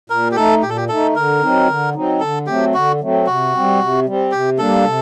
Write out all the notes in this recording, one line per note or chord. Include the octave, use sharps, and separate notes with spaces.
A#2 A#4
G4
A3 D#4 A4
A#2 G4
A4
G4
A3 D#4 A4
D3 A#4
F#3 C4 D#4
D3
F#3 C4 D#4
D3 A4
F#3 A3 C4 G4
D3 F#4
F#3 A3 C4
C3 F#4
G3 C4
C3
G3 C4
C3 G4
G3 A#3 D4 A4
C3